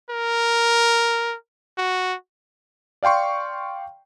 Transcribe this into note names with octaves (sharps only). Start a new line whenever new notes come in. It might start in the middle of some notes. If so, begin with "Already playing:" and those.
A#4
F#4
D5 F5 G5 C6 C#6